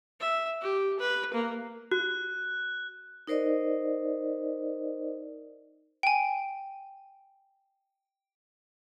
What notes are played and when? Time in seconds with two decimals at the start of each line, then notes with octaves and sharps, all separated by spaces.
0.20 E5
0.61 G4
0.99 B4
1.33 A#3
1.91 F#4 F#6
3.27 D#4 A#4 C5 D5 D#5
6.03 G5 G#5